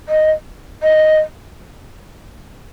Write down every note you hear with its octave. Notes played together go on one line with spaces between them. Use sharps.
D#5
D#5